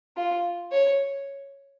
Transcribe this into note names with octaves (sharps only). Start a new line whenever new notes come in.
F4
C#5